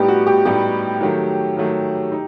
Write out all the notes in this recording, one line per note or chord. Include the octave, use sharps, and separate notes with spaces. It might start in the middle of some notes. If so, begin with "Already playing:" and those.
Already playing: A2 G3 B3 D#4 G4
F#4
G4
A2 G3 B3 D#4 G4
D#3 F#3 A3
D#3 F#3 A3
D#4